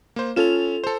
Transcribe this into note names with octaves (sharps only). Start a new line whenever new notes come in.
A#3 C5
C#4 F4 A4 E7 F7
A4 C5